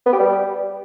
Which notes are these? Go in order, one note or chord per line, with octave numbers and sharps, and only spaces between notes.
B3
G4
G3